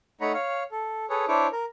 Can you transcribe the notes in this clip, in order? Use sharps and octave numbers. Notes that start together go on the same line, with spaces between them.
A3 D#4 C#5 F#5 A#5 B5
C#5 F5
A4
G#4 A4 B4 C#5
D4 E4 C5 C#5 D6
A#4